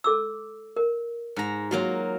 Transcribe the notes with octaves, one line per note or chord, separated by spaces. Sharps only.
A4 D6 E6
A#4
G#2 A#5
F#3 A#3 F4 F#4